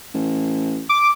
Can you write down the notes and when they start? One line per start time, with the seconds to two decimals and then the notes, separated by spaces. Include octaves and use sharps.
0.14 A1
0.89 D6